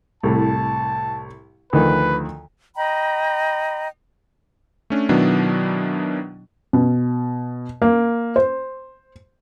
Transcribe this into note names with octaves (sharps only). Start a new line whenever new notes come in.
C2 A2 A5
D2 D#3 F3 B4
D#5 G5 A#5 B5
A3 C#4 D4
B2 D#3 F#3 B3 D4 E4
B2
A#3
C5